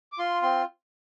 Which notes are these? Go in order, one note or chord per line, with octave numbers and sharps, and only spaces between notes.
D6
F4 C6
C4 C6